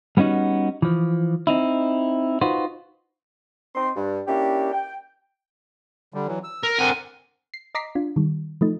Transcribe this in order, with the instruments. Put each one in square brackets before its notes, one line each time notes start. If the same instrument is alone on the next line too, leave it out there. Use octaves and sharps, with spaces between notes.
[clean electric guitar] G3 B3 C#4 D#4 F#4
E3 F3
C4 D#4 E4
D#4 F4 F#4 B4 C5
[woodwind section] C4 D#4 C6
G2
A#3 C#4 D4 E4 G4
G5
[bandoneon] D3 G3
E3 F#3
E6
[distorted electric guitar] A#4
[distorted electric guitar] D3 G#5 [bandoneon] C4 A#4 F#5
[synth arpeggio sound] C7
D#5 A#5 D6 B6 C7
D4 F4
D#3 G3
F3 A3 D#4